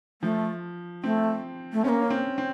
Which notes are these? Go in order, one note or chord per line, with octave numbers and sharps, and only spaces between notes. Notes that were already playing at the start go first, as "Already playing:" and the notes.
F3 A3
A3 C4
A3
C4 C#4
A#3
C#4
C4
C4